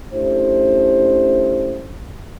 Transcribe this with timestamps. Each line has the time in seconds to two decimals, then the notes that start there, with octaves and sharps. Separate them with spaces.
0.13 A3 C#4 D4 E4 G4 C5